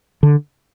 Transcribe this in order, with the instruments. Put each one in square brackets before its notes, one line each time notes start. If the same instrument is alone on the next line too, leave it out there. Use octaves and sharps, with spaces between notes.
[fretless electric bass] D3